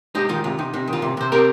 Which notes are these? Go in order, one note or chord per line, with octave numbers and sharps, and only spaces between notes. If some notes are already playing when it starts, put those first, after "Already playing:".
G#3 D#4 G4
D#3 F4
C3 F4
C3 D#4
C3 D#4
D#3
F4
C3
C3 C5
C4 G4 A#4